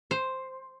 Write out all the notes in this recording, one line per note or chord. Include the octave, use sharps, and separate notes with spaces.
C5